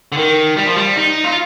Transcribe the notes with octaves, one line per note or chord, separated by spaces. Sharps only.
D3
D#3
G3
F3
G3
D#4
F4